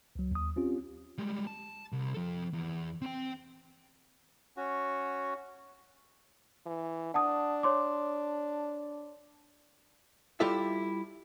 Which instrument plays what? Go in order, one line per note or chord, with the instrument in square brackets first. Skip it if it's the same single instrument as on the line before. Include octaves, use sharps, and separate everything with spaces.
[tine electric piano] C#2 F#3
D#2 D#6
C4 C#4 F4 G4
[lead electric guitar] G3 G#3
A5
C2
F3 A4
E2
C4 G5
[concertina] C#4 F#4
[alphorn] E3
[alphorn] D4 [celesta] F#5 A5 D#6
[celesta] C#5 C6 D6
[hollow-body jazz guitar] G3 E4 F4 G4 A4 E5